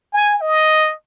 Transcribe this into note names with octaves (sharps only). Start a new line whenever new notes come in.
G#5
D#5